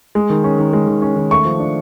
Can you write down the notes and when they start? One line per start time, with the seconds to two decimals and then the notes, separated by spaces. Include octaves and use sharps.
0.15 G#3
0.30 D#3
0.44 C#4
0.58 D#3
0.73 G#3
0.88 D#3
1.02 C#4
1.16 D#3
1.31 A3 C#6
1.45 F3
1.60 D4